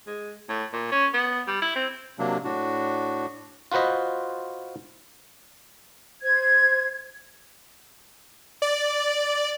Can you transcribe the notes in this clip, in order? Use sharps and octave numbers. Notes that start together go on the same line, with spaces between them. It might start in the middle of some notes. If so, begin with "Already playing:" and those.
G#3
A2
A#2
C#4
B3
G3
E4
C4
C3 F#3 A#3 D4
A2 D4 F#4
F4 F#4 B4 C5 D#5
C5 G#6
D5